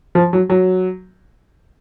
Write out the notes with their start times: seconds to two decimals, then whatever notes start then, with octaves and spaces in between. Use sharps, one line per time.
0.15 F3
0.33 F#3
0.50 F#3